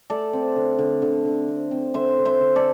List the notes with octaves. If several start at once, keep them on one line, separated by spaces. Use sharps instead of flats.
A3 A4 D5
C4
D3
D3
D3
D3
C4
C4
D3 C5 E5
D3
C5 E5
D3
A4 D5